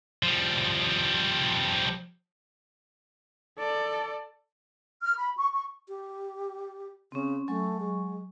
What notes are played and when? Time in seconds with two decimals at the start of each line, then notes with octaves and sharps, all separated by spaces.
0.23 F3 G3
3.59 A4 D5
5.02 F6
5.17 B5
5.37 C#6
5.52 C#6
5.88 G4
7.12 C#3 C4 C#4
7.48 F#3 A3 G#5 C#6
7.80 G#3